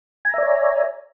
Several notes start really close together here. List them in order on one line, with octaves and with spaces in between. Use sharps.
G#5 A#5 E5 D5 C#5